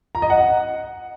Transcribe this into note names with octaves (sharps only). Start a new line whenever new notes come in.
A#5
D#5
F#5